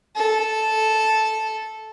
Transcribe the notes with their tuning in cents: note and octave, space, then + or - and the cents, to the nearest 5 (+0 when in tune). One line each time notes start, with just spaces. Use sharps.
A4 -10